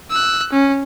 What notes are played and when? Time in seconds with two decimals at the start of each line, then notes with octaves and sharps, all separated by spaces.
0.11 E6 F#6
0.52 C#4